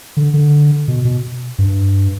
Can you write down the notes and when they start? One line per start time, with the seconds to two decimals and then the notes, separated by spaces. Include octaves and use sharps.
0.17 D3
0.34 D3
0.88 B2
1.05 B2
1.59 G2